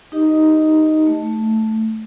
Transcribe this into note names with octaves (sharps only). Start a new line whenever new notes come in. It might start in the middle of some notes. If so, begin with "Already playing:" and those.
D#4 G4 D#5
A3